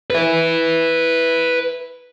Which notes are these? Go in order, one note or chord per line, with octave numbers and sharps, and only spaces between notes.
B4 E5